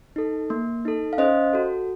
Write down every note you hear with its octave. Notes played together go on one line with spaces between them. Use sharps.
D#4 A4
A#3
D#4 A4
F5
C#4 C5 D#5
F#4 A4